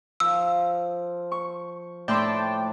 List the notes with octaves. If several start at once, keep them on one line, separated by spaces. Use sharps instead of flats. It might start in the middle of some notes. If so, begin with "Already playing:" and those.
F3 E6
C#6
A2 D4 D5 G5 A5 C6